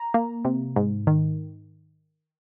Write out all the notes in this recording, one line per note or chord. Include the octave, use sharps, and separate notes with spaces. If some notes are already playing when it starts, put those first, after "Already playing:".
Already playing: A#5
A#3
C3
G#2
D#3